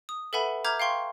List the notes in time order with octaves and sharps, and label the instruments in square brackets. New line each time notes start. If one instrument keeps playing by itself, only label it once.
[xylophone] D#6
A4 B4 E5 F#5 G#5 B5
E5 A#5 D6 F6 G6 G#6
F5 G5 C6 C#6